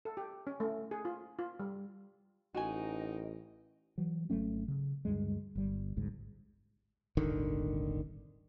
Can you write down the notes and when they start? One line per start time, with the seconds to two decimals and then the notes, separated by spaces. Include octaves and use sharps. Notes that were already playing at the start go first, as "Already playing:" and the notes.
0.05 A4
0.17 G4
0.47 C#4
0.60 A3
0.91 G#4
1.05 F4
1.39 F4
1.60 G3
2.54 A1 D#4 F#4 A#4 D#5 G5 G#5
3.98 E3 F#3
4.30 G#1 F#3 A3 C#4
4.68 C#3
5.05 D2 G2 G3 G#3
5.55 G1 G3
5.96 A1 D2 G#2
7.17 D#1 G#1 D3 D#3